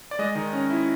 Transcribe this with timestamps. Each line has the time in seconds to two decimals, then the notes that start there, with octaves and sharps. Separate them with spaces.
0.11 D5
0.19 G#3 D#5
0.35 D#3
0.53 C#4
0.70 E4